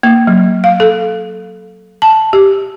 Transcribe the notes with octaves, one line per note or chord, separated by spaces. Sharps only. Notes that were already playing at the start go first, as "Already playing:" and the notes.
A#3
F#3
F5
A4
A5
G4